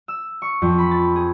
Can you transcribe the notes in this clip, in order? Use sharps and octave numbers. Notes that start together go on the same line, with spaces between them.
E6
C#6
F2
B5
A6
G#4